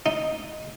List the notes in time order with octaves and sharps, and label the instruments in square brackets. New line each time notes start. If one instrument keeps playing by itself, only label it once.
[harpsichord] D#4